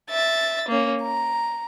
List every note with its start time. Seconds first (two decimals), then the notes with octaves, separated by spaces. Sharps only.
0.10 E5 A6
0.68 A#3 C#4
1.02 A#5